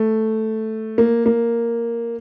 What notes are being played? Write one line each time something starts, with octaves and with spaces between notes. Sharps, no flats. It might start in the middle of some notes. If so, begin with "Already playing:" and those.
Already playing: A3
A#3
A#3